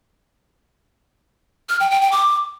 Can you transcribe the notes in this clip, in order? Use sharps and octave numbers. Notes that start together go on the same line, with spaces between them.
F6
G5
G5
G5
D6